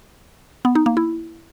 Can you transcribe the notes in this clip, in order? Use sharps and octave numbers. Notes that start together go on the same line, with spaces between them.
B3
D#4
A#3
E4